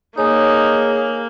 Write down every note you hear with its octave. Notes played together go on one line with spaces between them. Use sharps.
A#3 D#4 G#4 C#5